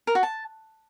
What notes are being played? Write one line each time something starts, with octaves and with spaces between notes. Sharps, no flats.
A#4
F#4
A5